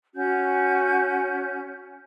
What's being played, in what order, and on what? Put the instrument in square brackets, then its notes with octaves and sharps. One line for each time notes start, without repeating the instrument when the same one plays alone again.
[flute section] C#4 F#4 G6